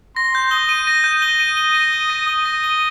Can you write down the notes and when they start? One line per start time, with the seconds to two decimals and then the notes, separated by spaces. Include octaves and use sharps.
0.16 C6 A#6
0.35 G6
0.51 D#6 G7
0.69 D#7
0.87 A#6
1.04 G6
1.22 G7
1.40 D#7
1.57 G7
1.74 A#6
1.92 G7
2.10 A#6
2.28 D#6 G7
2.45 A#6
2.64 G7